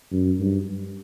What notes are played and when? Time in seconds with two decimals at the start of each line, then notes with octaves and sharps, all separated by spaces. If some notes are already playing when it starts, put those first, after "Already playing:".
0.12 F#2
0.39 G2